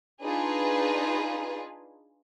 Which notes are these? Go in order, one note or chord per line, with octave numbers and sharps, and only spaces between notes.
D4 D#4 F4 G#4 B4